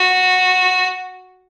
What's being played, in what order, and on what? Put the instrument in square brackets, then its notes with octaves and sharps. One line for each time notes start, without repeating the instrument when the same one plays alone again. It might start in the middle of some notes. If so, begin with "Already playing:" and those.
Already playing: [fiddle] F#4